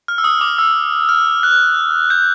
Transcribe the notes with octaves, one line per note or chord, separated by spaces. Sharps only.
F6
E6
D#6
D6
E6
F6
F#6
G6